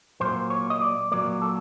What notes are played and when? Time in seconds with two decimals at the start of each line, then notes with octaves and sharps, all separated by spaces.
0.21 A#2 F#3 A#3 C5
0.50 C#5
0.70 D#5
0.81 D5
1.11 A#2 F#3 A#3 D5
1.42 A4